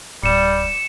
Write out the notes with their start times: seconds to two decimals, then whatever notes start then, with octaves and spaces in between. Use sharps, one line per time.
0.24 D1 G3 C#7 E7